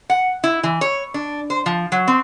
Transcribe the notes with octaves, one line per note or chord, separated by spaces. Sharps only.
F#5
E4
E3
C#5
D4
C5
F3
F#3
C4